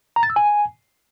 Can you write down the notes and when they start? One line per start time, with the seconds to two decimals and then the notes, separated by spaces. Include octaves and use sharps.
0.16 A#5
0.23 A6
0.30 E6
0.36 G#5